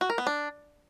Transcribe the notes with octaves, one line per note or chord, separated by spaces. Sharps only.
F#4
A#4
B3
D4